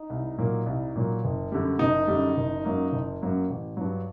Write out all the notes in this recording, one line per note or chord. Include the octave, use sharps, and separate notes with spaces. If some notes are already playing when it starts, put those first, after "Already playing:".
Already playing: D#4
C2
A#2 F#3 A#3
C2
A#2 F#3 A#3
F#1
F#2 D3 G3
F#1 D#4
F#2 D3 G3
F#1
F#2 F#3 A#3
F#1
F#2 F#3 A#3
A1
G2 F#3